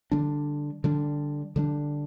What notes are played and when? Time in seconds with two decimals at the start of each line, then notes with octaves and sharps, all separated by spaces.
0.11 D3 G3 D4
0.84 D3 G3 D4
1.56 D3 G3 D4